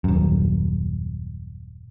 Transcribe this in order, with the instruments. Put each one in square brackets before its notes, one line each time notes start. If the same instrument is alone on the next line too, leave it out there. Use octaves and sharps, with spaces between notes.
[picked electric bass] D#1 F#2